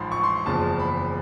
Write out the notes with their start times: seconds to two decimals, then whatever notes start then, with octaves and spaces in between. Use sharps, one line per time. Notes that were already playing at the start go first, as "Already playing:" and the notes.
Already playing: A1 G#2 F3 B5 C6
0.12 C#6
0.23 C6
0.46 F#1 E2 C#3 F3 A5
0.79 B5